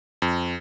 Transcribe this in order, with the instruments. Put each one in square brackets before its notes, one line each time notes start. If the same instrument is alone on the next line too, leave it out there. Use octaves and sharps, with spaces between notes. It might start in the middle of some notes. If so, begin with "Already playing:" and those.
[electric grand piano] F2